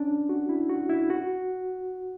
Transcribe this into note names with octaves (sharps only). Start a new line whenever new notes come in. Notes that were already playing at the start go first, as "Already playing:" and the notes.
Already playing: C#4 D4
F#4
E4
F#4
E4
F#4